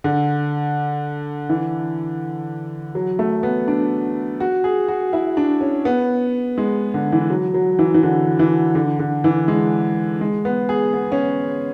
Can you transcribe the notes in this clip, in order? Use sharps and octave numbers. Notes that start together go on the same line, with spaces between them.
D3
E3
F#3
A3
B3
D4
F#4
G#4
F#4
E4
D4
C#4
B3
G#3
D3
E3
F#3
F#3
E3
E3
D3
E3
D3
D3
E3
G#3
G#3
B3
G#4
B3
C#4